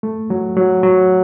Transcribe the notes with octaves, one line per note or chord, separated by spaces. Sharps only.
A3
F#3
F#3
F#3